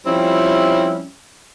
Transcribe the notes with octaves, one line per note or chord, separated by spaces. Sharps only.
F3 G3 C4 C#4 E4